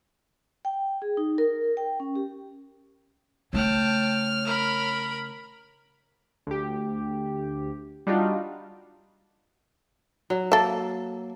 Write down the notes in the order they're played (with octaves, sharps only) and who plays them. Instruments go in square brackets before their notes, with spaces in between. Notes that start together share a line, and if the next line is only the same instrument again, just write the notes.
[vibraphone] G5
G#4
D#4
A#4
G5
C#4
G4
[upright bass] C#3 A3 [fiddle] C#5 F6 [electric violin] G5 A5
[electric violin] A#4 B5
[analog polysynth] D2 G4
G3 D4 D#4 F4 F#4
[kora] F#3
[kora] A#3 [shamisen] A4 E5